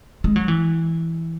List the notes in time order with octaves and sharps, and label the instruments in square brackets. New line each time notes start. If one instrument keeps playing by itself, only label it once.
[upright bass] G#3
F#3
E3